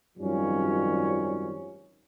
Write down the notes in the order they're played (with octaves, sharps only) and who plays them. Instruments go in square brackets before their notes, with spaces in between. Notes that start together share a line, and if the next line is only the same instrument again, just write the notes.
[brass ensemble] G#1 F#2 D#3 F3 G3 C#4